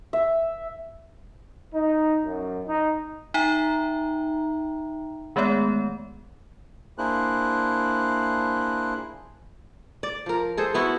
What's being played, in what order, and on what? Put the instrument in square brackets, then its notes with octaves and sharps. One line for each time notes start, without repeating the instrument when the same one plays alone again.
[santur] E5
[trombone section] D#4
F#2
D#4
[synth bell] D#4 E5 G5 A#5
D#3 G#3 A3 B3 C#5
[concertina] A#3 D4 E4 G#4 C5 F#6
[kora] D5
F3 A#4
G#4 A4 C5
B3 E4 F#4